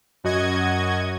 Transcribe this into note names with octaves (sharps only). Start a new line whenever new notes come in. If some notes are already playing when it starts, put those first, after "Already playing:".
F#2 F#4 D#5 G#6